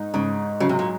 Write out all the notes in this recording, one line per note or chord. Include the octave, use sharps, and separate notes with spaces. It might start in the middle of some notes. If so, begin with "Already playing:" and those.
Already playing: G#2 D#4
G#2 C#3
C#3 F#3
C3
A#2